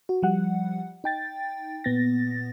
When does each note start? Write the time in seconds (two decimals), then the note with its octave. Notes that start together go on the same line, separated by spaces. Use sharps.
0.09 F#4
0.22 F3 G3 F#5
1.04 D#4 G5 A6
1.84 A#2 B3 A6 A#6